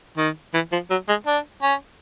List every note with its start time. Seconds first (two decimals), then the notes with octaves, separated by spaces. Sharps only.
0.17 D#3
0.54 E3
0.72 F3
0.90 F#3
1.08 G#3
1.27 D4
1.63 C#4